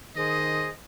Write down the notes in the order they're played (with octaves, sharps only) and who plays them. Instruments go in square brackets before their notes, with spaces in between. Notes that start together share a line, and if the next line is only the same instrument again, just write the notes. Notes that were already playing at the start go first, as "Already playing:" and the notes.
[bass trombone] D#3 [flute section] G#4 C5 D#6 [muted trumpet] D#5